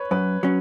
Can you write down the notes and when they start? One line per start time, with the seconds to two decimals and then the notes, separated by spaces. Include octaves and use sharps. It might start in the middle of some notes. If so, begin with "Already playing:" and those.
Already playing: B4 C#5
0.11 F#2 B4
0.43 F#3 C#4